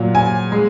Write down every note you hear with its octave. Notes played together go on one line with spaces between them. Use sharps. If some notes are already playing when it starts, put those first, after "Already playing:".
Already playing: A#2 F#3
G#5
G#3